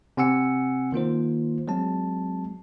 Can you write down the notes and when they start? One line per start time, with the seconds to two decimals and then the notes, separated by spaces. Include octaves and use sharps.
0.17 C3 C4 F#5 G#5 E6 C#7
0.92 D#3 A#3 F4 C5
1.68 F#3 G#3 C4 A5